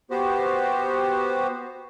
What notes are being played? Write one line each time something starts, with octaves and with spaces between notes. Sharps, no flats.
B3 F#4 G4 C5